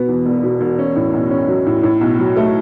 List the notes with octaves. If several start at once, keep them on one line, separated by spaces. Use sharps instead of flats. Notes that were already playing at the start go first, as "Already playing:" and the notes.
Already playing: B2 B3
E2
E1
B2
E1
C#4
A2
B1
C#4
F#3
A2
A2
B1
F#3
A3